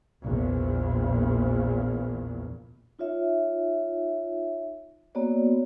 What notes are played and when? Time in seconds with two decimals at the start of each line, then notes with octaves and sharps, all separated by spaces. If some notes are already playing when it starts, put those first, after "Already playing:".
0.23 A#1 E2
2.99 D#4 F4 C#5 E5
5.15 A#3 B3 F#4 C#5 D5